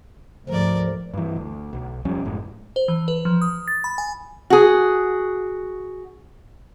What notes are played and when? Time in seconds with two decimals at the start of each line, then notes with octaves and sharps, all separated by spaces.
0.49 D2 G#2 F3 A#4 D5
1.14 G2 E3
1.36 D2
1.73 B1
2.05 D#1 F2 G3 C#4
2.25 F#1 F#2 A2 G#3
2.76 C5
2.88 E3
3.08 B4
3.25 F3
3.42 D#6
3.68 A6
3.84 B5
3.98 G#5
4.50 F#4 G#4